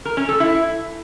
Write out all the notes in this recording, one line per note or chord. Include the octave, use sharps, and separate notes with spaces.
A#4
C#4
A4
E4